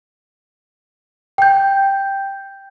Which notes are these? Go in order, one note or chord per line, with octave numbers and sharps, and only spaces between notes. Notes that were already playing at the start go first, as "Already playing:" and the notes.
G5 G6